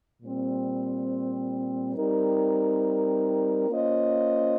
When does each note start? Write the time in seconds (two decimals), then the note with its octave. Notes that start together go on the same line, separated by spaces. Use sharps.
0.22 A#2 G3 C4
1.95 G3 C4 D#4 A#4
3.69 A#3 C#4 F4 C5 D#5